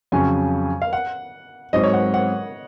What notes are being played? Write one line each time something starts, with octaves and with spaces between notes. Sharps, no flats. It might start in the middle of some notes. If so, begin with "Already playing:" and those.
F2 C#3 F#3 C#4 G#5
F5
F#5
G#2 F#3 C4 D#5
C#5
F#5
F#5